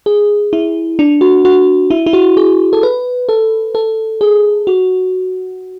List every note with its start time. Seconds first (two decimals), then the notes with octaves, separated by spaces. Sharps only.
0.06 G#4
0.53 E4
0.99 D4
1.21 F#4
1.45 F#4
1.90 E4
2.06 E4
2.13 F#4
2.37 G#4
2.73 A4
2.83 B4
3.29 A4
3.75 A4
4.21 G#4
4.67 F#4